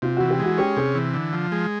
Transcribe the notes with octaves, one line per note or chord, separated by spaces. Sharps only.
C3 F4
E3 F#4
G4
G#3 F#4
C#4 G4
C3 G#4
E3
D3
F3
G#3